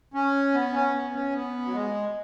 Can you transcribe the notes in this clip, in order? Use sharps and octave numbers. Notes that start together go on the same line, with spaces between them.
C#4
B3
C#4
B3
C#4
B3
F#3
G#3